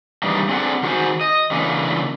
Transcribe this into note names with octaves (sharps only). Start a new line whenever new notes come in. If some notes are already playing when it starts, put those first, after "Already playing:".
G2 D#3 E3 G3 G#3 D4
C4 D4 G#4 A4 D#5 F#5
D#3 F#4 G#4 C5
D#5
C#3 E3 A3 A#3 D4